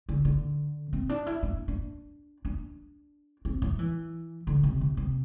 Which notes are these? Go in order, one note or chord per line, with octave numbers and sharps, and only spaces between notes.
D3
D3
C4
D4
E4
D4
D4
D4
C4
F#3
E3
D3
C3
C3
C3